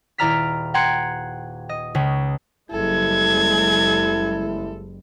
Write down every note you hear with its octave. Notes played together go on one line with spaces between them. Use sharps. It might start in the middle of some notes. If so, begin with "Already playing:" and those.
D#1 E4 D5 A#5 F6 B6
F#5 G5 A#5 C6 G#6 C#7
D#5
C#2 C#3
F#1 G3 G#3 E4 A4 G#6